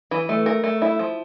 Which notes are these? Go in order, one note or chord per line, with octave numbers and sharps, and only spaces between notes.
E3
A3
A#4
A3
E4
F3